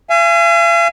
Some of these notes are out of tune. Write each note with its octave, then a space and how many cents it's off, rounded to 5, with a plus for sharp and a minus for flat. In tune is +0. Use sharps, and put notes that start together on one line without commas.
F5 -45 G#5 +0